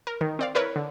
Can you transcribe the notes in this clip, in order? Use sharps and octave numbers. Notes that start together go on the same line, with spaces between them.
A#4
D#3
C4 D5 F5
E4 A#4 B4 C#5
D3